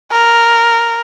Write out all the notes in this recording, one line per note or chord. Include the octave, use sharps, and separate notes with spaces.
A#4